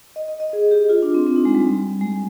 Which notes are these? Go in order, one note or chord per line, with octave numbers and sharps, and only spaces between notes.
D#5
D#5
D#5
G#4
G4
F4
D4
C4
C4
D#4
G#3
G3
G#3